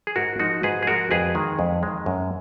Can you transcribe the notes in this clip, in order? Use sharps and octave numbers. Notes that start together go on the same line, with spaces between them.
G#4
G#2 F#4 A#4
F3 G#3 D#4 F#4
G#2 G#4 B4
G#4
F3 G#3 F#4 A#4
F2 G#4 B4
D#3 G#3
F2
D#3 G#3
F#2